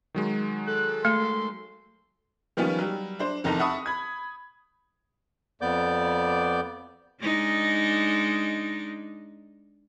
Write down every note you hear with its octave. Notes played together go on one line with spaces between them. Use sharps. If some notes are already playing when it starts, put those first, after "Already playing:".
D#3 F#3 G#3
A4 F#6
A3 C6
D#3 F3 G3 B3 C#4
F#3 G3
D4 C5
F1 E2 D#3 D#4 A4 A#5
E5 F#5 A5 B5 C#6 D#6
B5 G#6
F2 B3 D5 D6 G6
G#3 D4 D#4